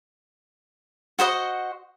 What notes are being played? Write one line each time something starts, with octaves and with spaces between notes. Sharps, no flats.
F#4 C5 D#5 F#5